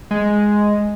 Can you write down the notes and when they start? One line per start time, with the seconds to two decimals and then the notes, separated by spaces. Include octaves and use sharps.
0.11 G#3